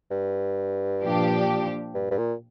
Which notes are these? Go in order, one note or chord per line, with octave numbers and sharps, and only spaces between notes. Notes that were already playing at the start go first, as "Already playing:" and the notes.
G2
A#2 F3 D4 G4
G2
G2
A#2